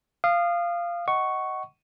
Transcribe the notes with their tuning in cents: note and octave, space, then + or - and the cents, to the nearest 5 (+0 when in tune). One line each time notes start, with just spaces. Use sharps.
F5 -10 D#6 -35
D#5 +0 F#5 +20 C#6 +0